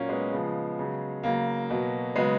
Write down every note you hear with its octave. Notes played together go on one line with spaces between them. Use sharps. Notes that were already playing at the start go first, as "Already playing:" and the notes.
Already playing: A#2 F#3 A#3 C#4
G#3 B3
C#3 F3
C#3 F#3
C#3 F#3 A#3
B2 F#3
C#3 F#3 G#3 B3